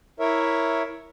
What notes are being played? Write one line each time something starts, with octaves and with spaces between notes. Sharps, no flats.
E4 A#4 C#5 E5